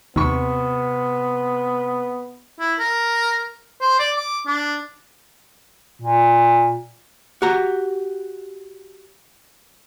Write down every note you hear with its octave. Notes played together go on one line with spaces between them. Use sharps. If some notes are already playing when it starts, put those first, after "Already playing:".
D#2 C3 B3 B5 C#6
E4
A#4
C5
D5
D6
D4
A#2
F#4 G4 A#5